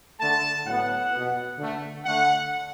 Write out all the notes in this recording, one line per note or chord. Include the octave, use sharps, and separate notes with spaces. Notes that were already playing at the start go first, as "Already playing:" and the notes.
D3 A3 A5
A2 F#3 B3 F#5
B2 B3
D3 A3
D3 A3 F#5